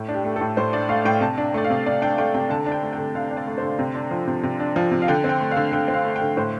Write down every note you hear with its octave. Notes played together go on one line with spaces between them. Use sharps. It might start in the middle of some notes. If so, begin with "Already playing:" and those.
Already playing: A2
D4
G4
A3
A4
A2
A2 C5
D4 D5
A3 F5
A2 G5
C3 A5
D4
A3 D5
F5
C3
C3 D5
D4 G5
A3 G5
C3 G5
D3 A5
D4
G5
A3
G5
D3
D3 F5
D4
D5
A3
D3 C5
C3
D4
F3
C3
C3
D4
F3
C3
F5
D3 G5
C4
G5
A3
F5
D3
D3 G5
C4
F5
A3
G5
D3
A2 C5